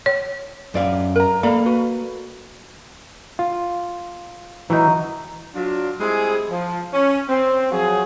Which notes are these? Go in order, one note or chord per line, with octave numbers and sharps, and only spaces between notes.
C#5
F#2 D5 F5
A#4 A#5
A#3 A4 D5 F5 A#5 B5
F#4 B4
F4
E3 F#3 D#4
F#3 D4 F4
G3 G#3 C4 E4 G#4
F3
C#4
C4
F3 F#3 G#4